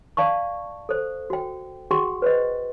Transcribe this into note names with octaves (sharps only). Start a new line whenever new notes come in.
D5 F5 A5 C#6
A4 C5
F#4 G5
F#4 G#4 F#5 G5 C6 C#6
B4 C5 D#5